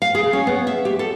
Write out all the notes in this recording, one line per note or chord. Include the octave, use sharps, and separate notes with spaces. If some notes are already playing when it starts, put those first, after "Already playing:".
F5
G#4
C#4
B3
E5
G4
A4